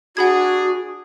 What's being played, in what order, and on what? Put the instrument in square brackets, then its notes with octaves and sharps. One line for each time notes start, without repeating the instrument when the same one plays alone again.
[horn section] D4 G#4 [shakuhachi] F#4 [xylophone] F#5 B5 G#6